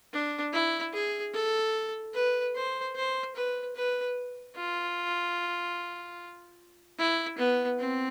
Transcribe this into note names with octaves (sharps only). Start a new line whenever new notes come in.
D4
E4
G#4
A4
B4
C5
C5
B4
B4
F4
E4
B3
C4